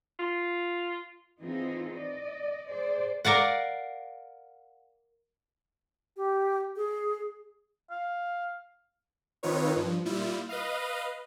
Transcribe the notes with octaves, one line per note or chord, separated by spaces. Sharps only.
F4
E3 C4 D#4 F4 G#4
D5 D#5
G#4 C5 D5
A#4 D5 F5 F#5
G4
G#4
F5
D#3 C4 D#4 F4 B4 C#5
G2 F3
A#2 G3 E4 F4
B4 D#5 F5